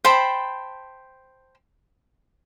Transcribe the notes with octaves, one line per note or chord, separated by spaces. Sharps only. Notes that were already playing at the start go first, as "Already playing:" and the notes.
C5 G5 A5 B5